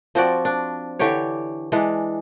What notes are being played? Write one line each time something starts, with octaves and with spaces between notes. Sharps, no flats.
F3 C4 F#4 D5
D4
D3 E3 G4 C#5
E3 G#3 D4